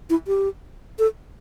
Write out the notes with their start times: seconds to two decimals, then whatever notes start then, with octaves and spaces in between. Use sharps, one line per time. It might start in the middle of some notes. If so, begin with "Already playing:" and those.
0.10 E4
0.27 G4
0.99 A4